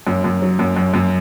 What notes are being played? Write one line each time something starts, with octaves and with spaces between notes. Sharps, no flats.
F#2
F#2
F#3
F#2
F#2
F#2